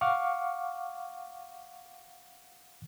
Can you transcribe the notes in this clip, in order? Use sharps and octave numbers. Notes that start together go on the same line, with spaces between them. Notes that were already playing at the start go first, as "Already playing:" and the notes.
F5 F#5 C#6 D6 F6